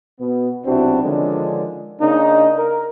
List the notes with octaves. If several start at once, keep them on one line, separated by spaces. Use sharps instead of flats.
B2 B3
B1 C3 C4 D4 E4 F#4
D3 D#3 F3 G#3 C#4 D4
C#3 A#3 D4 D#4
A#4